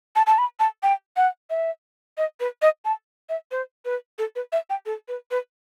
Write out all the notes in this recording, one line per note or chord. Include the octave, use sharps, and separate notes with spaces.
A5
A5
B5
A5
G5
F#5
E5
D#5
B4
D#5
A5
E5
C5
B4
A4
B4
E5
G5
A4
B4
B4